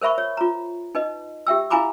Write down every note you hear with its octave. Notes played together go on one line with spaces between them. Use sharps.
A#4 C5 E5 B5 C#6
C#5
F4 A#5
D#4 B4 D#5
G4 E5 G5 E6
E4 F5 G#5 A#5 B5 D6